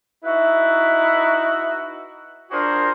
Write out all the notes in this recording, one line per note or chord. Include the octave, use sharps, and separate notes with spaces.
D#4 E4 F#4 B4 E5
D4 F4 F#4 G#4 A#4 C5